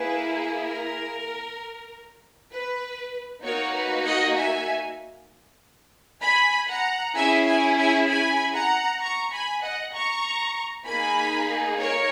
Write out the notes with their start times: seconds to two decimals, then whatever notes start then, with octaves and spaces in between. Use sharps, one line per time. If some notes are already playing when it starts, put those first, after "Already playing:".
Already playing: A#3 E4 G#4 B4
0.65 A#4
2.52 B4
3.44 A#3 D#4 F#4 A#4 C#5
3.75 B4
4.05 D#5 F#5
4.36 E5 G#5
6.22 G#5 B5
6.69 F#5 A#5
7.15 C#4 E4 G#4 E5 G#5
7.46 E5 G#5
7.77 E5 G#5
8.08 G#5 B5
8.55 F#5 A#5
9.01 A#5 C#6
9.32 G#5 B5
9.62 D#5 F#5
9.94 A#5 C#6
10.86 A#3 D#4 G#4 G#5 B5
11.79 A#4 C#5